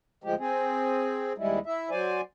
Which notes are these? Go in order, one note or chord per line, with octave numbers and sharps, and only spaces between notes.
D2 F3 G#3 G4
C4 G#4
D#2 G3 G#3 E4
E4 E5
F#3 C5 D5 G#5